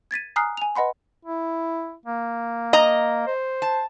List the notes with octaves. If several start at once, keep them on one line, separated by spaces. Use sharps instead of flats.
G#6 A6 B6 D#7
G#5 A#5 D#6 F6 F#6 C7
G#5 F7
B4 D#5 F#5 B5 C6
E4
A#3
D#5 A#5
C5
A5